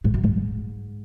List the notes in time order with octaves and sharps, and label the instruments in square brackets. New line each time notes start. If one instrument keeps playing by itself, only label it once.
[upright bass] G#2
F#2
G#2